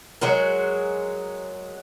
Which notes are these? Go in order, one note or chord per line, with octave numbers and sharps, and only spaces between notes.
F#3 G#3 F#4 A#4